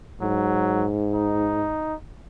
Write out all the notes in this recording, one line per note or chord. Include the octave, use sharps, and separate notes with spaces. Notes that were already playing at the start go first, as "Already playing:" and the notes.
G#2 F#3
D#4